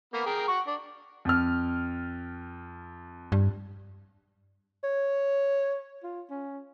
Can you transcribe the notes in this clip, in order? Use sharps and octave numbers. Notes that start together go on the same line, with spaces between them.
A#3 B3
G#4 A#4 G5
F#5 C#6
D4
F2 F6
G2
C#5
F4
C#4